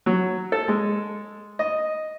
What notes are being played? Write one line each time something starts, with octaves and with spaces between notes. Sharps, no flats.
F#3
A4
G#3
D#5